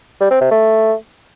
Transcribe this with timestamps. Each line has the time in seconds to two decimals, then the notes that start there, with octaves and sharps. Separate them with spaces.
0.21 G3
0.31 C4
0.41 C3
0.51 A3